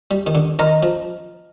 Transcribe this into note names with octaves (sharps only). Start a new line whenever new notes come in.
G3
D#3
D3
D#3 D#5 A#5 F6
F3